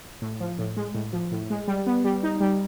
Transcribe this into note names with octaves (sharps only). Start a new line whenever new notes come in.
A2
F3
A2
G#3
A2
F3
A2
G#3
G3
B3
G3
D#4
G3